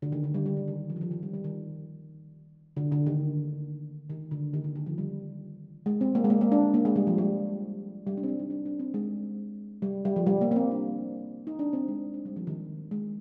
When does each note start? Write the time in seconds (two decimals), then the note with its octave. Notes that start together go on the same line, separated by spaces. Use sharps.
0.02 D3
0.12 D#3
0.24 D3
0.34 G3
0.46 G3
0.57 D#3
0.68 D#3
0.90 F3
0.96 D#3
1.01 F3
1.11 D#3
1.23 G3
1.34 G3
1.44 D#3
2.77 D3
2.92 D3
3.06 D#3
4.10 D#3
4.31 D3
4.54 D#3
4.64 D3
4.76 D#3
4.86 F3
4.98 G3
5.86 G#3
6.01 C4
6.15 A#3
6.24 G#3
6.30 A#3
6.41 A#3
6.52 D4
6.74 A#3
6.85 G#3
6.96 G3
7.07 F3
7.18 G3
8.07 G3
8.17 D4
8.23 C4
8.28 D4
8.40 D#4
8.50 D4
8.66 D4
8.79 C4
8.94 G#3
9.82 G3
10.05 G3
10.16 F3
10.26 G3
10.41 A#3
10.51 A#3
10.56 C4
10.71 D4
11.47 D#4
11.59 D4
11.73 C4
11.88 G#3
12.14 D4
12.25 G3
12.36 F3
12.47 D#3
12.91 G#3